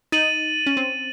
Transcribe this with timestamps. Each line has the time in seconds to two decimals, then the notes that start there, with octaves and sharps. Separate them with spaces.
0.12 D#4 A6 D#7 F#7
0.67 C#4
0.77 C4